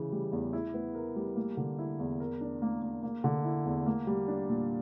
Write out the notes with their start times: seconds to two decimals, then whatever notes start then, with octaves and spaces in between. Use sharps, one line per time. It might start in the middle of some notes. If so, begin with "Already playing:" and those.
Already playing: C#3 E3
0.12 G3
0.33 E2
0.53 E4
0.74 B3
0.95 A#4
1.16 G3
1.36 A#3
1.57 D3
1.79 E4
1.99 E2
2.20 A#4
2.41 D4
2.62 A#3
2.82 A#3
3.03 A#3
3.24 D3
3.44 E4
3.66 E2
3.86 A#3
4.07 G3
4.28 D4
4.49 A#2